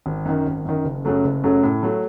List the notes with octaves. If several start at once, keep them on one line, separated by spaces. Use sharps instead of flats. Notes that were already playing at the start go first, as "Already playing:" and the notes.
G#1
F#2 D#3
G#1
F#2 D#3
F#1
F#2 C#3 F#3 A3
F#1
F#2 C#3 F#3 A3
A2
F#3 A3